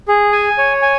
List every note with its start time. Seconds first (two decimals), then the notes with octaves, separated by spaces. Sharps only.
0.08 G#4
0.32 G#5
0.58 C#5
0.82 G#5